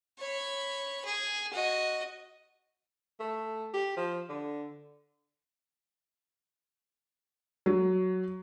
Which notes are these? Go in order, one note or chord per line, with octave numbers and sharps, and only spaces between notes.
C#5 B5
G#4
F#4 D#5
A3
G4
F3
D3
F#3